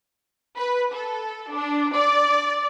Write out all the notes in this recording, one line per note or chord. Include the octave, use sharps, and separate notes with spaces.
B4
A4
D4
D5